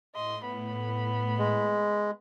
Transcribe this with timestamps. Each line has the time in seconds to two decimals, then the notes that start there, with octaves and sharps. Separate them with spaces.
0.15 A2 D#5 C6
0.44 B3 B5
1.38 G#3